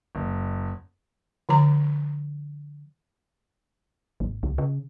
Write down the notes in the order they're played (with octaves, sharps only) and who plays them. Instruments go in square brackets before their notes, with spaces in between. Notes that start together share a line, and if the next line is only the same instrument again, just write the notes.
[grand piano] F#1
[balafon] D3 F3 A#5
[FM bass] G#1
C#2
C#3